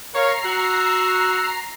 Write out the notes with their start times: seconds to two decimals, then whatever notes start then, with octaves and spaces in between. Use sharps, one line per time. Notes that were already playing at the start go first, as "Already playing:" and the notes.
0.14 A#4 C#5 F5 A#5 C7
0.44 F#4 E6